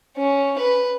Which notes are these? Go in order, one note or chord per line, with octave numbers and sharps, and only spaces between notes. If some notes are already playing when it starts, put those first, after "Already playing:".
C#4
B4